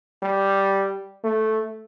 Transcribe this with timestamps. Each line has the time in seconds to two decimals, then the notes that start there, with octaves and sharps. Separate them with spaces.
0.23 G3
1.24 A3